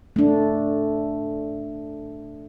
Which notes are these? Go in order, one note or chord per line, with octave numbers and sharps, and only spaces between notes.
A3 D4